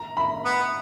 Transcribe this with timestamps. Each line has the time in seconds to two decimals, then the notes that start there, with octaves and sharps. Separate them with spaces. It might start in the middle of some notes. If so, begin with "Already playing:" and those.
Already playing: A#5
0.17 B5
0.45 B3